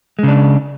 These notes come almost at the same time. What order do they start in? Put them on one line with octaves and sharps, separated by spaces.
G#3 C#3 D4